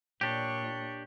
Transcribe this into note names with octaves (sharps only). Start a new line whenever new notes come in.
A#2 D4 G4 C#5